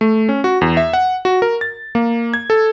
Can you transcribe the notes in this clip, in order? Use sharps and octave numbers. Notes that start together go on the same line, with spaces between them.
A3
C#4
F#4
E2
E5
F#5
F#4
A#4
A6
A#3
G#6
A4